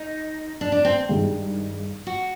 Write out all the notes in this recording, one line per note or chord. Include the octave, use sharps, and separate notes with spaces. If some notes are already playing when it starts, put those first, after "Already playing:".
Already playing: D#4
D4
D4
C4
G2 D#3 G#3
F#4